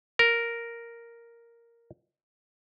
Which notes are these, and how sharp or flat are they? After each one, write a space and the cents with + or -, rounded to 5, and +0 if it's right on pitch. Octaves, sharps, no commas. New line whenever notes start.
A#4 +0